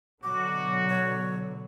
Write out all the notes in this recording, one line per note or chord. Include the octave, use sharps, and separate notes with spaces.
B2 D3 F#3 F#4 D6
C#5